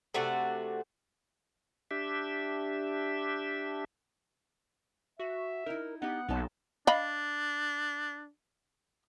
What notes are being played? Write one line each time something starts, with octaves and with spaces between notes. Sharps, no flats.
C3 A3 D4 F#4
D4 G4 E5
F#4 E5
D#4 E4 A#4
B3 D#4 G4 F#5
B1 A#3 B3 D#4 A5
D4 D#5 F5 B5